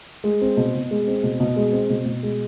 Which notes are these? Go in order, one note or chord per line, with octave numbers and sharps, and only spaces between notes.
G#3
C4
B2
B2
G#3
C4
B2
B2
G#3
C4
B2
B2
G#3